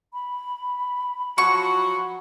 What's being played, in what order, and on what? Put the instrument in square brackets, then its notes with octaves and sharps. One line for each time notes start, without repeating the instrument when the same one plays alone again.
[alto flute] B5
[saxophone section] F3 F#3 F#4 [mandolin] C#6